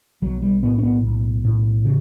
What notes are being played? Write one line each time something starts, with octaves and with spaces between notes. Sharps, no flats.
B1 F#3
G3
A2 B3
C#4
B3
B1
A2
C#3